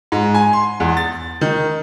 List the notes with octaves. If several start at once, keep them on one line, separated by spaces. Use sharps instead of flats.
G#2
G#5
C6
E2
A6
D#3